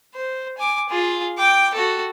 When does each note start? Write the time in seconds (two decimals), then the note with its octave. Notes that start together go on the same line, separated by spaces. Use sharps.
0.15 C5
0.58 G#5 D6
0.89 F4 G#4
1.38 G5 D6
1.74 F#4 A4